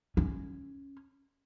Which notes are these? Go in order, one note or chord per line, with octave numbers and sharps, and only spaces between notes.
C#4